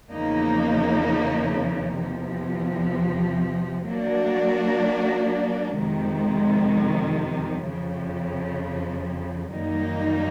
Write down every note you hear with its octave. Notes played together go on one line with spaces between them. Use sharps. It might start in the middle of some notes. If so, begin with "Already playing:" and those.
E2 C#3 F3 A#3 D#4
E2 C3 F3
F#3 A#3 D4 F#4
F2 C3 D#3 G#3
F2 C#3 F3
F#2 D#3 G3 A#3 D#4